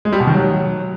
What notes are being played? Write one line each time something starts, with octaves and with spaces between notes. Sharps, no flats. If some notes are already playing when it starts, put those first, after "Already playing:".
G#3
G3
B2
D#3
F#3